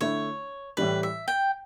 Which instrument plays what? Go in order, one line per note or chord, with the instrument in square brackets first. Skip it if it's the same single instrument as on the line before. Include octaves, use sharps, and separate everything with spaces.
[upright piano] D3 A3 E4 [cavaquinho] C#5
[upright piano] A2 E3 G3 [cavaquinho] B4
[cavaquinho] E5
G5